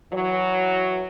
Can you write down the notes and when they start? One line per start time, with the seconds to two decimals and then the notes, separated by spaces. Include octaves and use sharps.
0.13 E3 F#3